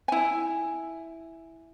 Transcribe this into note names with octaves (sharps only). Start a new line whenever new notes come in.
E4 G#5